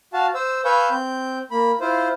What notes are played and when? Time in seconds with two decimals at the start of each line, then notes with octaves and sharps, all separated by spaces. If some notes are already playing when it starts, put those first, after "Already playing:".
0.13 F#4 F5 A5
0.35 C5 E6
0.65 B4 F5 G#5 C#6 E6 G6
0.90 C4 G6
1.51 A#3 B5
1.81 E4 F4 C5